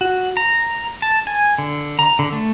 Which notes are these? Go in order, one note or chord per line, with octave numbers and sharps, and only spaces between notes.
F#4
A#5
A5
G#5
D3
A#5
D3
A3